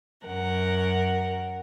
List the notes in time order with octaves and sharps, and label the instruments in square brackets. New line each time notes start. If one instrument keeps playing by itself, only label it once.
[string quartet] F#2 A#4 F#5